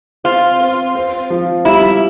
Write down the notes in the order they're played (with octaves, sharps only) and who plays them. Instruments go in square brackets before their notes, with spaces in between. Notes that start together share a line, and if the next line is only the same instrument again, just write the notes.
[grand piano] C4 [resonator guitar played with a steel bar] F4
[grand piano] C4
C4
F3
[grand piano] G3 [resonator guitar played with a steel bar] E4